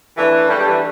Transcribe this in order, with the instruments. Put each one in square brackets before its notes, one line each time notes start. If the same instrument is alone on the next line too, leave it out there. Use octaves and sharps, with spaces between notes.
[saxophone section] E3 [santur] A3 D4 A4
[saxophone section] G3 [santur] A3 D4 A4
[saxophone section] G3
E3